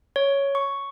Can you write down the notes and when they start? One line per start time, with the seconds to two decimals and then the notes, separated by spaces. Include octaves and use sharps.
0.16 C#5
0.55 C#6